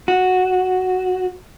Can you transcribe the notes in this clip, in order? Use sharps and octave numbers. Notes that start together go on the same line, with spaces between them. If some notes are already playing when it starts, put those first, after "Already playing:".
F#4